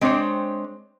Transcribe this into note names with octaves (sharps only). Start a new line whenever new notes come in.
G#3 C4 D4 C5 C#5